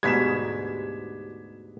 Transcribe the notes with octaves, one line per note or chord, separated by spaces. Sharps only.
D2 G#2 B2 G4 G#6 B6 E7